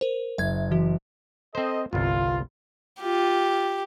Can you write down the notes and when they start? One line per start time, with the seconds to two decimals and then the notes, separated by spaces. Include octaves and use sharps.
0.01 A#4 C5
0.38 F#1 E5 G#6
0.71 E3 F#4
1.55 C4 A4 C5 D#5
1.93 G1 C2 F4
3.01 F4 G4